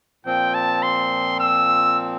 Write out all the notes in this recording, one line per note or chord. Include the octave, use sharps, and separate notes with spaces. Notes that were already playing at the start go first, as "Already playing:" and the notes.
A#2 F3 C4 G5
A5
C6
E6